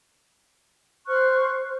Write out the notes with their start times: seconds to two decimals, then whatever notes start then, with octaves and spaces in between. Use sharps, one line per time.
1.07 C5 C#6 F6 F#6